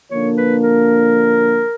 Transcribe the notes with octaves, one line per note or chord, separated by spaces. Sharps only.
D3 F3 A#3 D4 C#5
B4
A#4